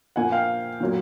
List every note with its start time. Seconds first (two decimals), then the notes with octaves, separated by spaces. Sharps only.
0.16 A#2 F3 A#3 F#5 G#5
0.32 F5 G5
0.80 A#2 F#3 A#3